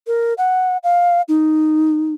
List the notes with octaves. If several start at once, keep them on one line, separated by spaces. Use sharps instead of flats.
A#4
F#5
F5
D#4